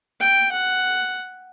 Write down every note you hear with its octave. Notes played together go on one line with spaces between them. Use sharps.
G5
F#5